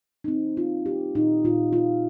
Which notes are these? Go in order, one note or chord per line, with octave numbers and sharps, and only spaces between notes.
D#4
G3 C4
A#3 F4
G3 G4
A#2 D#4
A#2 F4
G3 F4